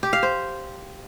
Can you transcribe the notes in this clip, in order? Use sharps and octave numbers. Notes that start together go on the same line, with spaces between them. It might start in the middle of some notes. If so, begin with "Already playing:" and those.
G4
F5
C5